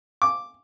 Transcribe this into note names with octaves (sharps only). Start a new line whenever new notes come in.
D6